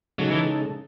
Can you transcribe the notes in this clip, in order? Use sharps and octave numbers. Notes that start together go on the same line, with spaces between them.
C#3 F#3 G#3 D#4 A4
E3